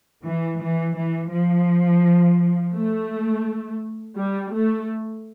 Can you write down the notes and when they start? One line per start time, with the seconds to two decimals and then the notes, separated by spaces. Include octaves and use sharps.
0.24 E3
0.60 E3
0.96 E3
1.31 F3
2.75 A3
4.17 G3
4.52 A3